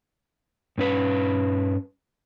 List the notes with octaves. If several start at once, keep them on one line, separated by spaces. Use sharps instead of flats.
G2 C#4 B4